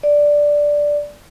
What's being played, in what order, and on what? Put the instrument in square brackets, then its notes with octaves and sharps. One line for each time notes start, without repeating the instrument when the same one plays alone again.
[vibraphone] D5